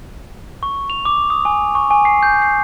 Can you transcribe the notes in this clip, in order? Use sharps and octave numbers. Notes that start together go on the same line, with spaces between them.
C#6
F7
D6
D#6
G#5
C#6
G#5
C7
G6
C7